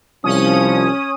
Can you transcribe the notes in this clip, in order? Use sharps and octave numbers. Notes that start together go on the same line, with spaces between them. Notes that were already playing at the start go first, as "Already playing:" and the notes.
C2 F3 C#4 D#6